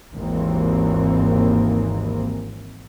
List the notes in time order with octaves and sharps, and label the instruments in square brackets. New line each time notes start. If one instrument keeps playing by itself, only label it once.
[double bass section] G#1 D#2 E3 A#3 C4